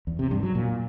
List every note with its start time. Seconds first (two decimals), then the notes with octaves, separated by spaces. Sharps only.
0.07 E2
0.19 C3
0.31 G2
0.43 F#3
0.55 A#2